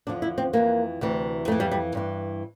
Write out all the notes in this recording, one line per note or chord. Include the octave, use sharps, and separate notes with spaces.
E2 D3 F3 D4
E4
C4
F2 E3 A#3
D2 C3 E3
F2 E3 A3
G3
G3
G2 E3